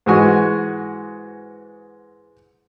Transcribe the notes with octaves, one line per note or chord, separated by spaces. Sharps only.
G#2 E3 G#3 F#4 G#5